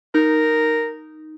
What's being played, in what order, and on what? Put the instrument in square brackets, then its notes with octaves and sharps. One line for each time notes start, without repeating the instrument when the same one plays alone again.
[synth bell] D#4 [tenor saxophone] A#4